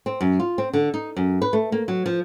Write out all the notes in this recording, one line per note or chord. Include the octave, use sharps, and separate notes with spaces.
C4
F#2
F4
C4
D3
D#4
F#2
B4
A3
A#3
F#3
F3